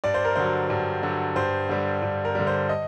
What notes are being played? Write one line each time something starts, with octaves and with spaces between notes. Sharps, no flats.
G2 D5
C5
A#4
D3 F#3 C5
G2
D3 F#3
G2 C5
D3 G3
G2
A#4
D3 G3
C5
D#5